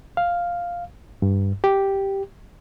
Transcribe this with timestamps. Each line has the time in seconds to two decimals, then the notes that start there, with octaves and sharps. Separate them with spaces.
0.17 F5
1.22 G2
1.64 G4